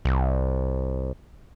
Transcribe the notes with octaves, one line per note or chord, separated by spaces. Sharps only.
C2